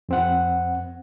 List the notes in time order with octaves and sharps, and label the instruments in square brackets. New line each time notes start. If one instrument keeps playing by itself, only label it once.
[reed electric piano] F2 C4 F#5